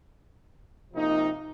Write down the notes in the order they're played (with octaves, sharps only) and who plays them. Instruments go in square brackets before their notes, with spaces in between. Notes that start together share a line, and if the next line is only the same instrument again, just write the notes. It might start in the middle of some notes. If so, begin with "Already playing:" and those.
[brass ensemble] C3 F3 A#3 D#4